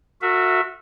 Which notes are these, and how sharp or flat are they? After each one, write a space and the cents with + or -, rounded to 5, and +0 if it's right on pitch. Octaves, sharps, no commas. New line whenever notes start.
F#4 -20 A#4 -40 E5 +0